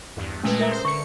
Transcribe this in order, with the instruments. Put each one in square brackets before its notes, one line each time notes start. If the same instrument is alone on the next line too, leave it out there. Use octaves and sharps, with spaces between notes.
[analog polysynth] E2 G2
[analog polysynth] A#2 G#3 A3 [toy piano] C#4 B4
[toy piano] A#4 E5 A#5
[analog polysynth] C5
[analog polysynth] D3 C#7 [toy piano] C#6